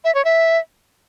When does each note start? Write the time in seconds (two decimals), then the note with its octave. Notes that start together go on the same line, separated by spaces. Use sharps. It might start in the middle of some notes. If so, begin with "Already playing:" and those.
0.05 E5
0.15 C#5
0.25 E5